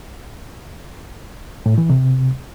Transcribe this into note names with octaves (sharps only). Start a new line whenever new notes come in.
A2
E3
C3